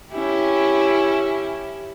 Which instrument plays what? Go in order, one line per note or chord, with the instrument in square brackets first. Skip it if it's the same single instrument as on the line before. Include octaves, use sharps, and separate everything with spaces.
[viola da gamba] C#4 E4 G4